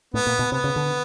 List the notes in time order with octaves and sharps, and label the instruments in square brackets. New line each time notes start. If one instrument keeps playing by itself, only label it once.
[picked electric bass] A2 [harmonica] B3
[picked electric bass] A#2
B2
[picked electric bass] C3 [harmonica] B3
[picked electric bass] C#3
D3